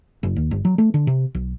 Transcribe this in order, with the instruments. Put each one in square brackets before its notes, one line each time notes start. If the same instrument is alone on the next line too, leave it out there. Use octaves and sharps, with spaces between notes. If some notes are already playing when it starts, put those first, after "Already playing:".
[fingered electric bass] F#1
D#2
G1
F#3
A3
D3
C3
B1